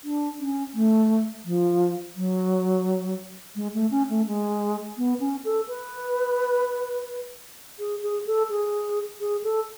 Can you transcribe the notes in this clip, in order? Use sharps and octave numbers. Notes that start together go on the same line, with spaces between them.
D4
C#4
A3
F3
F#3
G#3
A3
C#4
A3
G#3
B3
C#4
A4
B4
G#4
G#4
A4
G#4
G#4
A4